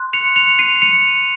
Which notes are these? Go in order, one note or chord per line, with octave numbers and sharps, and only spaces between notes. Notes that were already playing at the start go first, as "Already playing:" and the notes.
Already playing: C6 F#6
C#7 F7
C#7 F7
C7 D#7
C#7 F7